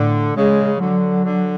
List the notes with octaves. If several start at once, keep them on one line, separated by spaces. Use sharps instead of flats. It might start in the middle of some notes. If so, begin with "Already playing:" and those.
Already playing: A2 D3
C#3 G#3
D3 F#3
D3